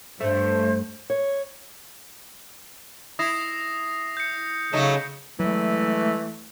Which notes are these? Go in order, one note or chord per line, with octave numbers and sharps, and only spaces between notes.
G2 A3 C5
C#5
E4 D#6 A#6 C7
G6 C#7
C#3 F#3 A3 D#4
E3 F#3 G#3 A3